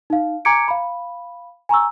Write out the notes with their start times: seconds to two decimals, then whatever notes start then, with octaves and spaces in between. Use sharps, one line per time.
0.10 D#4 F5
0.45 G#5 A#5 D6 G#6 C#7 D7
0.68 F5 B5
1.69 G#5 A#5 C#6 E6